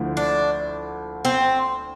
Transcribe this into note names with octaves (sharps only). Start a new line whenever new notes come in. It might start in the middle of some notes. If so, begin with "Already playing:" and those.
Already playing: D2 D3 F3 A3 E4
D4
C4